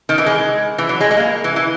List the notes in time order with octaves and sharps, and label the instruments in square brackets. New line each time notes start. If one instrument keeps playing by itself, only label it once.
[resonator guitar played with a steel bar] D#3
E3
G#3
E3
F#3
G#3
G#3
A#3
E3
E3